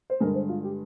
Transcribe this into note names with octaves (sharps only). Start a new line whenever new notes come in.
C5
G2 D3 G#3 A#4
C5
F4
G4